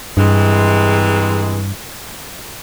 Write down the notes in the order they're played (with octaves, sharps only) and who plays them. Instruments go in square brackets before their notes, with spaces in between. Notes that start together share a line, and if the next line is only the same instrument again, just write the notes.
[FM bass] G2 [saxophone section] C3 E3 G#3